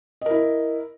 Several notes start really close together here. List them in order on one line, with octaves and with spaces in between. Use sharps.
D#5 A#4 E4